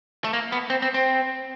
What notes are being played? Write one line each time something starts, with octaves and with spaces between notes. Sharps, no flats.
A3
A#3
B3
C4
C4
C4